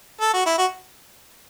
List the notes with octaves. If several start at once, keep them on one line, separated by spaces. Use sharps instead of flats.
A4
F#4
E4
F#4